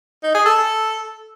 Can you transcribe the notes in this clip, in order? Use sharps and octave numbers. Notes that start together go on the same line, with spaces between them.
D#4
G#4
A4